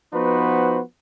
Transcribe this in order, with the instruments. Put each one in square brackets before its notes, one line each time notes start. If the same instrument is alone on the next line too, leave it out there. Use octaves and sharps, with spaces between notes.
[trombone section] F3 B3 D#4 F#4 B4 C5